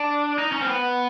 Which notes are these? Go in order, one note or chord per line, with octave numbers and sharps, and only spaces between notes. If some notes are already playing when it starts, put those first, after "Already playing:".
Already playing: D4
D#4
C#4
C4
B3